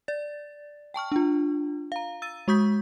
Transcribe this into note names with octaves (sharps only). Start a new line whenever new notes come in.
D5 A6
G5 A5 C#6 F6
D4 F4
F5 A#5
E6 A6 D#7
G#3 F#4 C#6 D#6 G6 B6